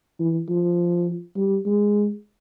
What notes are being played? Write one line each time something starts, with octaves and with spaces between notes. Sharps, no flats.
E3
F3
G3
G#3